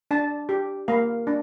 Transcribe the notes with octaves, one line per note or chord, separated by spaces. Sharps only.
D4 A5
G4
A#3 F5
D4